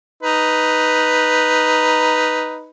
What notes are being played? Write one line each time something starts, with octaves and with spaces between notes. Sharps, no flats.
D#4 B4